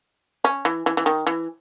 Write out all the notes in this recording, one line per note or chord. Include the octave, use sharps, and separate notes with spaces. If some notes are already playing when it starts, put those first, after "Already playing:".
C#4
E3
E3
E3
D#3
E3